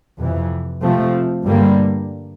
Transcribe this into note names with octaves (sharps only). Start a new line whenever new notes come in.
F2 C3 E3
C3 F3 A3 C4
G2 D3 G3 A#3